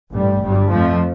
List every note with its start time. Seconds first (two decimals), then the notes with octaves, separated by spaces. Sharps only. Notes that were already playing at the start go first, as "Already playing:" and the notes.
0.11 A1 G2 G3
0.40 G1 G2 G3
0.68 F2 F3 A3